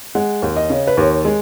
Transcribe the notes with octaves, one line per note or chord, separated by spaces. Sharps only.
G#3 F#5
D#2
D#5
C#3
B4
D#2 C#5
G#3